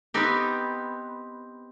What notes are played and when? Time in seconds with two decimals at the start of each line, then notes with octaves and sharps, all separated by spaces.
0.14 B3 C4 D#4 G4